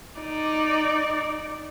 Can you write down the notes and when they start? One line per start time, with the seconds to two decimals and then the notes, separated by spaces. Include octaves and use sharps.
0.20 D#4 D5